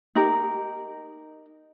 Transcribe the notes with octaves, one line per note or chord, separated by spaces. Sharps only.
D#4 G4 A#4